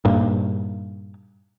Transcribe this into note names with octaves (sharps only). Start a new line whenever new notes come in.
G2 A#2